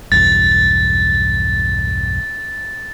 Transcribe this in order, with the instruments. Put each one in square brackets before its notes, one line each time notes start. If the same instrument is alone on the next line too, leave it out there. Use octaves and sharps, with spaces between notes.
[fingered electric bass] B1 E2 G2 [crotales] A6